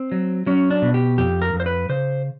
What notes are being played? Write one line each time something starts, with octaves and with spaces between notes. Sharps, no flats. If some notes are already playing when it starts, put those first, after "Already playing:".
Already playing: C4
F#3
F#3 C#4
D4
B2
G4
F2 G4
A#4
F2
C5
B4
C#3 C5